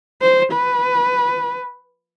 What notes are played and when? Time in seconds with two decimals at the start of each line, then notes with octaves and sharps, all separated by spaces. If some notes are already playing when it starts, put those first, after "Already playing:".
0.22 C5
0.52 B4